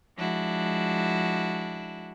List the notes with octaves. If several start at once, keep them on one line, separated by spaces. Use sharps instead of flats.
F3 G#3 D4 E4 F#4